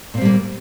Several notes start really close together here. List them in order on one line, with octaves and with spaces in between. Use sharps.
A#2 C4 G3 A#3